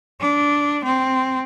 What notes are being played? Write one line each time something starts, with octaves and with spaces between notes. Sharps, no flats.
D4
C4